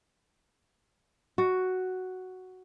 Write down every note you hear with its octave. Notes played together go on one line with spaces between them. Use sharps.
F#4